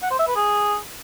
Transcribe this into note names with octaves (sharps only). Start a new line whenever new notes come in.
F#5
C5
E5
B4
G#4